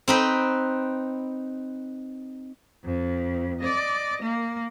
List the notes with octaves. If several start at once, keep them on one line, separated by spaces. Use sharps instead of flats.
C4 D#4 B4
F2
D5 D#5
A#3